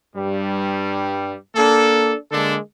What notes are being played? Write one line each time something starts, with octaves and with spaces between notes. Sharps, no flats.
G2 G3
A#3 D4 A4
D3 G#3 A#3 D4 A4